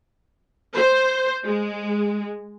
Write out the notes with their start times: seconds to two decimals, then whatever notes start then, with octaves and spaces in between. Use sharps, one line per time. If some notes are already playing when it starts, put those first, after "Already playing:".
0.76 C5
1.44 G#3